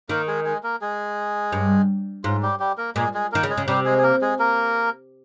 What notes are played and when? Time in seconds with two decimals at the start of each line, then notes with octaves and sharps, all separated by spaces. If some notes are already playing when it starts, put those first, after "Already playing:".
0.09 D#3 A#3 A#4
0.27 G#3 G#4
0.45 G#3 G#4
0.63 A#3 A#4
0.81 G#3 G#4
1.52 G2
2.24 G#2 F4
2.42 G3 G4
2.60 G3 G4
2.77 A#3 A#4
2.95 A#2 G#3 G#4
3.14 G#3 G#4
3.32 D#3 A#3 A#4
3.43 C#3
3.50 G#3 G#4
3.58 C#3
3.67 C3 G3 G4
3.85 G#3 G#4
3.98 G#4
4.03 A#3 A#4
4.21 G#3 G#4
4.39 A#3 A#4